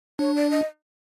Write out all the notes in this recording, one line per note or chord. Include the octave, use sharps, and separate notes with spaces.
D4 C#5
D5
D#5